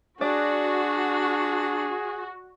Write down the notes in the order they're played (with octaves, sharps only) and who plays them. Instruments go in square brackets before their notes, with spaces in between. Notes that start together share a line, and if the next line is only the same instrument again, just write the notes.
[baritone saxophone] D4 [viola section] F#4 [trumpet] G#4 [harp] D5